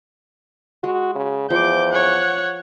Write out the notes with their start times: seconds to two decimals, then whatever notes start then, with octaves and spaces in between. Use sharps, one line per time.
0.84 G#3 F#4
1.16 C#3
1.50 E2 F3 D6 G6
1.92 C#5 F#5